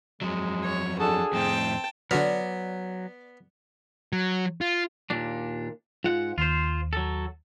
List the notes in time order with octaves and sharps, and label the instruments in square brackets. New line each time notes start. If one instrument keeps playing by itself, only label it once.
[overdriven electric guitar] F2 F#3 [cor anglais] G#3
[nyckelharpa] C#5
[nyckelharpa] D4 F#4 [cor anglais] G#4 [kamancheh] A4
[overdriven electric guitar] F2 A2 [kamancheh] C4 [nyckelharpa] G5 A5
[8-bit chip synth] D3 F#4 F6 [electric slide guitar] F#3 [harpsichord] B3 [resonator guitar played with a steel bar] D5
[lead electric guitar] F#3
F4
[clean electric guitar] D#2 A#2 D4
[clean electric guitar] G#2 F#5 [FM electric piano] F4
[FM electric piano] D#2 [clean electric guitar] F4 C5
[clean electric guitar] F#3 A4